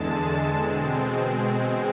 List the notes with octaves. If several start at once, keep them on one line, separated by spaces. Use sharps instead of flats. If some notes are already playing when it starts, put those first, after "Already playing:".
Already playing: E2 D3 G#3 A5
B2 G#3 C4